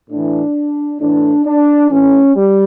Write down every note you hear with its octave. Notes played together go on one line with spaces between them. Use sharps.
A2 E3 D4
A2 E3 D4
D4
A2 E3 C#4
G3